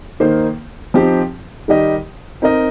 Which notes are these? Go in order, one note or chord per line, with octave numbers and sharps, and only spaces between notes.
D#3 A#3 D#4 C5
F3 C4 D#4 G4
D#3 G3 D#4 G4 D#5
C4 D#4 A#4 D#5